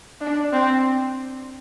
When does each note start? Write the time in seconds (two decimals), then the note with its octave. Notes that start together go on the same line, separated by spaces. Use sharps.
0.21 D4
0.53 C4